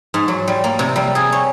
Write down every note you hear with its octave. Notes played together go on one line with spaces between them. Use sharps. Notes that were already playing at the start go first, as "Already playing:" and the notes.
G#2
F#3
G3
A#3
C3
G3
G#4
C#5